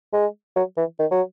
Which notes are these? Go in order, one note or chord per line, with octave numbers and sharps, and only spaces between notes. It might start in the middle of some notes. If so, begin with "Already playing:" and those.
G#3
F#3
E3
D#3
F#3